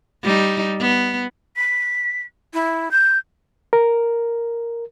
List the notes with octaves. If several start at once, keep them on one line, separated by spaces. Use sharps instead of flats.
G3 D#4
B3
B6
E4
G6
A#4